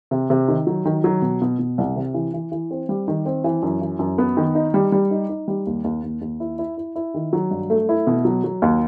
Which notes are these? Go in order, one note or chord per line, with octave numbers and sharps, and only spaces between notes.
C3
C3
D#3
F#3
D#3
F#3
B2
B2
B2
C2
C3
E3
E3
E3
C4
G3
D#3
C4
E3
F#2
E3
F#2
B3
D#3
D#4
G3
G3
D#4
D#4
G3
D#2
D#2
D#2
D#2
E4
E4
E4
E4
D#3
F#3
G2
A3
E4
B2
F#3
F#3
D#2